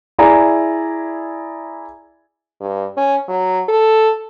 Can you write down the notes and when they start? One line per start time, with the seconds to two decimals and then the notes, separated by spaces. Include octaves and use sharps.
0.18 E4 G#4 D5 E5 G#5 A#5
2.60 G2
2.97 C#4
3.28 F#3
3.69 A4